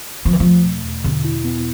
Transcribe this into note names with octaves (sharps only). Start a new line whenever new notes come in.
E2 F3
E3
F3
A3
B2
E2
B2 D3
E4
B3